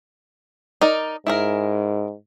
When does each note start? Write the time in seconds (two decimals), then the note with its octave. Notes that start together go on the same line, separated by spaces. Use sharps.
0.81 D#4 A#4 D5
1.27 G#2 E4 G#4 A#4